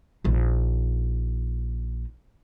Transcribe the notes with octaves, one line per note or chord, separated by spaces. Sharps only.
A#1 D#4